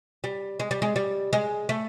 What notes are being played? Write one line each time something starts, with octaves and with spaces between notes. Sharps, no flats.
G3
G#3
G3
G#3
G3
G#3
A3